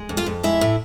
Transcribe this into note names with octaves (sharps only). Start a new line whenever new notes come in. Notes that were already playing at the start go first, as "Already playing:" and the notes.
Already playing: G#3
F2
F4 F5
F2
G#3 E4 E5
A2